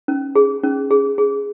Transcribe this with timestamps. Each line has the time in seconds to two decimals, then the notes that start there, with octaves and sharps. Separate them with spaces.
0.08 C#4
0.35 G#4
0.63 C#4
0.91 G#4
1.18 G#4